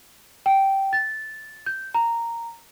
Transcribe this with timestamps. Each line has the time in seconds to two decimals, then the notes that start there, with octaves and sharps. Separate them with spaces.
0.46 G5
0.93 A6
1.66 G6
1.94 A#5